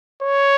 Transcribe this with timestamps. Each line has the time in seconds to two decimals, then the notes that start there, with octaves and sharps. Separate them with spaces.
0.23 C#5